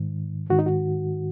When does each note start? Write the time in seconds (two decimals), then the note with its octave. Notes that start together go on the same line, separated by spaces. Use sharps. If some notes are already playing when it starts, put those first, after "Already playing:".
Already playing: G#2 D#3
0.50 G#2 D#3 F#4
0.59 D#4
0.66 F#4